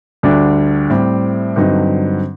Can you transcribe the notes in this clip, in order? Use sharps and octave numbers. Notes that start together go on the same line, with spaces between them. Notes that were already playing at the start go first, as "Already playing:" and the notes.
D2 D3 G3 D4
A2 G3 C4
G2 D3 F#3 C4 D#4